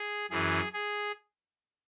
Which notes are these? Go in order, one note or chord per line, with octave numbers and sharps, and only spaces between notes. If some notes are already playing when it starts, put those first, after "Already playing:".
Already playing: G#4
F#2 E3 G#4
G#4